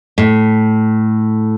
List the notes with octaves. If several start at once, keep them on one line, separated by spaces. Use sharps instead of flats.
A2